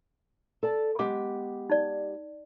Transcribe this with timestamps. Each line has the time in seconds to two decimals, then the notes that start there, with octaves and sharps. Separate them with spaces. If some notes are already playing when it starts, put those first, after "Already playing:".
0.63 A4 D5 A5
0.99 G#3 B3 G4 D6
1.70 D#4 D5